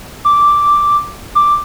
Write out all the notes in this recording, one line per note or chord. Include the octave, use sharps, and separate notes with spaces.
D6
D6